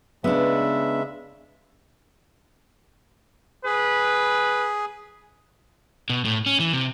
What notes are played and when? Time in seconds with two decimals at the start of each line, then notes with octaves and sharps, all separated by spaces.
0.24 C#3 G#3 B3 D4 E5
3.65 G#4 B4
6.10 B2
6.25 A2
6.46 C#4
6.60 E3
6.73 C3